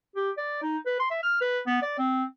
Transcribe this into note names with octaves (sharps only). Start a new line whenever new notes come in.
G4
D5
D#4
B4
C6
E5
F6
B4
B3
D5
C4